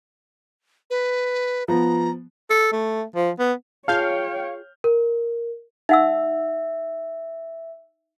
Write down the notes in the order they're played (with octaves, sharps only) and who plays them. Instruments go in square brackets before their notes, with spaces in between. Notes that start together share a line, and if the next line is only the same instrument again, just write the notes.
[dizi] B4
[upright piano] F3 B3 [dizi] A#5
[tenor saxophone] A4
A3
F3
B3
[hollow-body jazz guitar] F4 G#4 A5 [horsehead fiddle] C#5 G5 [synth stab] F5 [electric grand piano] F6 G6
[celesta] A#4
[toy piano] D#4 F#5 E6 [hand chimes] E5